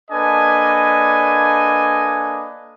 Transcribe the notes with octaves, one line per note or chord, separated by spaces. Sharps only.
A#3 D4 A4 B4 D#5 G#5